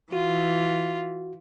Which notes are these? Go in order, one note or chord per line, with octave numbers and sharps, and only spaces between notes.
E3 F4 F#4